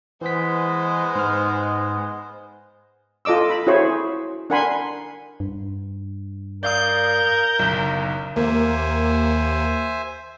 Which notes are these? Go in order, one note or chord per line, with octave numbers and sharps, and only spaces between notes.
E3 G#3 B3 C5 B6
G#2 F6
F4 A4 D#5 D6 E6
B5
E4 F#4 G#4 C5 C#5
D4 A#4 F#5 G#5 B5 C6
G2
A#4 D5 F5 D#6 G6
F#1 B1
D#2 A#3 C5 E5 G#5